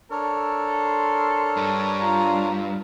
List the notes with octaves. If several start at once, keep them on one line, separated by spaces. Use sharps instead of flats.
D4 A4 A#4 C#5
C6
G2
F4 A#5